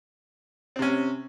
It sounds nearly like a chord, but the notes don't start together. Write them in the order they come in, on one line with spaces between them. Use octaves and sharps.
C4 C3 C#4